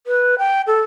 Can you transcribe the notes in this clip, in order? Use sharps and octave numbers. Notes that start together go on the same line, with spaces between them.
B4
G5
A4